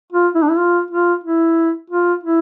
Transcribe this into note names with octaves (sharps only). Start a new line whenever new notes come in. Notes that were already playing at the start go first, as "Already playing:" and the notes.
F4
E4
D4
E4
F4
F4
E4
F4
E4